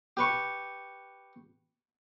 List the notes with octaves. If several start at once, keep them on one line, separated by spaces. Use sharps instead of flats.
G4 B4 C#6